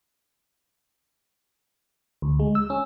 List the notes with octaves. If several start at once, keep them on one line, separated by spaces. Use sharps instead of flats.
D2
G#3
E6
C#4